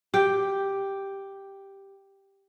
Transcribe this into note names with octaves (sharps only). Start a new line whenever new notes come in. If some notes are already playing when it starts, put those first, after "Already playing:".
G4 G5